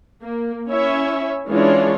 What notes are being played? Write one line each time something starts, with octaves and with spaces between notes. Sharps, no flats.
A#3
C#4 E4 C#5 E5
E3 G#3 C#4 D4 F4 C#5